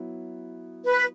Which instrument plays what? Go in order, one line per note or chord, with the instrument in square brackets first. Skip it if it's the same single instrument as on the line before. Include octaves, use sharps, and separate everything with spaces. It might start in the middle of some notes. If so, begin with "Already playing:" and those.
Already playing: [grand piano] F#3 B3 E4
[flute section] B4